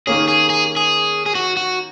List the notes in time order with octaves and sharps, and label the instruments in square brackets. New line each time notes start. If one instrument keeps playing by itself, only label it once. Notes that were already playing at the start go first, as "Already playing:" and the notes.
[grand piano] D#3 A#3 C#4 [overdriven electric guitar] G#4
[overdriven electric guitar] G#4
G#4
G#4
G#4
F#4
F#4